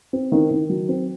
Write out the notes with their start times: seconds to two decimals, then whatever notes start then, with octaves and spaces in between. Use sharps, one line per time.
0.13 C4
0.32 D#3
0.51 D#3
0.70 F#3
0.89 C4